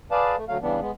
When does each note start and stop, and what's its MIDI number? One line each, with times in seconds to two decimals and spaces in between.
0.11 0.36 68
0.11 0.36 71
0.11 0.36 74
0.11 0.36 77
0.11 0.36 81
0.37 0.45 57
0.48 0.57 38
0.48 0.57 54
0.48 0.57 57
0.48 0.57 77
0.62 0.80 49
0.62 0.80 52
0.62 0.80 55
0.62 0.80 59
0.62 0.80 62
0.81 0.91 56
0.81 0.91 59